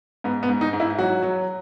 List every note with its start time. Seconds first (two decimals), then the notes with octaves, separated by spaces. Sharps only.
0.24 G#2 B3
0.43 B3
0.49 G#2
0.61 D#4
0.73 G#2
0.80 E4
0.98 F#3 F#4
1.23 F#3